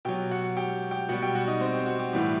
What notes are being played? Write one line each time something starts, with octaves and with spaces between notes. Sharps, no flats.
B2 F#3 G4 G5
F#4 F#5
G4 G5
G4 G5
B2 G3 F#4 F#5
G4 G5
F#4 F#5
D#4 D#5
C4 C5
G4
F#4
G4
A2 E3 G3 G4